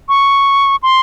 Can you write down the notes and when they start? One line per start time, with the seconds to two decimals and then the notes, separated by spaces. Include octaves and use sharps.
0.09 C#6
0.83 C6